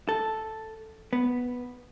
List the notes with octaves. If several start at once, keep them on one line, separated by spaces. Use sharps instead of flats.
A4
B3